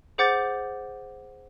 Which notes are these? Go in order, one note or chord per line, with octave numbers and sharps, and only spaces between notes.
G#4 C5 F#5 D6 G6 A6